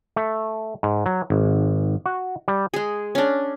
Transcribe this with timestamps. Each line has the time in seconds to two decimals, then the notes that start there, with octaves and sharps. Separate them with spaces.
0.16 A3
0.83 G#2
1.06 F#3
1.30 G#1
2.06 F#4
2.48 G3
2.74 G#3 G#4
3.15 C#4 D4